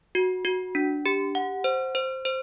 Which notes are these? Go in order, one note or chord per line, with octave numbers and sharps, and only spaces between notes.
F#4
F#4
D4
G4
F#5
C5
C5
C5